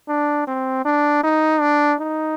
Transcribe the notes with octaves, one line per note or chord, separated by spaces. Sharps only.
D4
C4
D4
D#4
D4
D#4